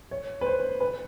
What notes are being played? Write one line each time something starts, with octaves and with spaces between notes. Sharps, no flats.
C#5
B4
C5
B4